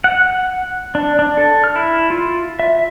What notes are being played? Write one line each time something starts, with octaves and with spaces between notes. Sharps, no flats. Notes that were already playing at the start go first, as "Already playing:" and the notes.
F#5
D4
D4
A4
F6
E4
F4
E5